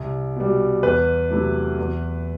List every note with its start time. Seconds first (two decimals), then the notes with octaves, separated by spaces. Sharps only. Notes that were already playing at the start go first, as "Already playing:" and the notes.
Already playing: C2
0.36 B2 G3
0.83 E2 B4
1.31 C3 F#3 A3 E4
1.78 E2